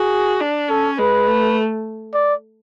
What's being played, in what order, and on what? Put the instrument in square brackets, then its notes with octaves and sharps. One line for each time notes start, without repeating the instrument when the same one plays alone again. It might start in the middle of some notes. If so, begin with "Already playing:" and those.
Already playing: [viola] F#4 [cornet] G#4
[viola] D4
[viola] C#4 [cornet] A4
[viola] G#3 [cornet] B4
[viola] A3
[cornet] D5